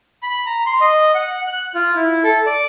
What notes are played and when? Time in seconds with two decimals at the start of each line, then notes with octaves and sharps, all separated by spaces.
0.23 B5
0.46 A#5
0.66 C6
0.81 D#5
1.15 F#5
1.47 F#6
1.75 F4
1.95 E4
2.24 A4
2.46 D5